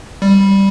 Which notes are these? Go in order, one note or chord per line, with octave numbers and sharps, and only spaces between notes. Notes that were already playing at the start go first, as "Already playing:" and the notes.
G3